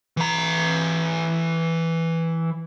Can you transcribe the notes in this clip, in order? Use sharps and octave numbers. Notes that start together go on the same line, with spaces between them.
E3 A#5